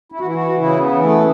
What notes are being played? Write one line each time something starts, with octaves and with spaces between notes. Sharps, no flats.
E4
F#4
E3 E4
F#4
C#3 E4
B3
E3
A3